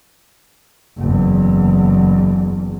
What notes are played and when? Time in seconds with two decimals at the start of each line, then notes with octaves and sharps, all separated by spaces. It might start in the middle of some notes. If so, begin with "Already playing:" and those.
0.97 F#1 E2